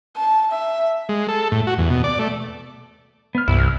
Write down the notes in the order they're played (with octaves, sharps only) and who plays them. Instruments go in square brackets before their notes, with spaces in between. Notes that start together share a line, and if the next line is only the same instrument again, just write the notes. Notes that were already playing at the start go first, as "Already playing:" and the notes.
[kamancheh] A5
E5
[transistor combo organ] G#3
A4
A2
F#4
E2
B2
D5
A3
[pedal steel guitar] B3 F6
[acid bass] C2 [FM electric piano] G2 [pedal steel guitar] E4
[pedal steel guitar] F6